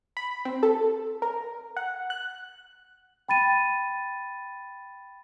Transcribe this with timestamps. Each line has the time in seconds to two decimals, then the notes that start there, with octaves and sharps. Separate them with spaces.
0.17 B5
0.45 C4
0.63 A4
1.22 A#4
1.77 F#5
2.10 F#6
3.28 G5 B5 A6 D#7